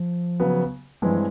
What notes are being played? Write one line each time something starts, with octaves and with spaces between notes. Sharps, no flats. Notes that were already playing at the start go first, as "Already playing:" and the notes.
Already playing: F3
C#3 F#3 B3
G2 E3 F3 G#3 C4